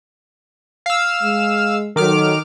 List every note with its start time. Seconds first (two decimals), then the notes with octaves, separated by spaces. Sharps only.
0.86 F5 E6
1.22 G#3
1.96 D#3 F#3 A4 D6 F6